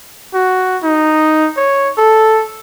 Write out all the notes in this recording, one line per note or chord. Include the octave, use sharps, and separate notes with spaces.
F#4
D#4
C#5
A4